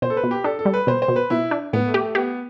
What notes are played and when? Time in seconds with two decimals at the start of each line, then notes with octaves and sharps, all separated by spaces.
0.02 B2 C5
0.10 A4
0.17 B4
0.23 B2
0.31 G4
0.44 D4 A4
0.59 A4
0.65 G3
0.74 B4
0.87 B2 C5
1.02 C5
1.08 B2
1.16 B4
1.30 B2 E4
1.51 D4
1.73 A2 B3
1.88 A3
1.94 G4
2.01 A3
2.15 B3 G4